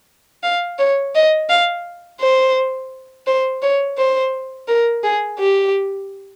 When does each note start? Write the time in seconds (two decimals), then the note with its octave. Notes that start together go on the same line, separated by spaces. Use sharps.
0.43 F5
0.78 C#5
1.15 D#5
1.49 F5
2.20 C5
3.27 C5
3.62 C#5
3.98 C5
4.68 A#4
5.04 G#4
5.39 G4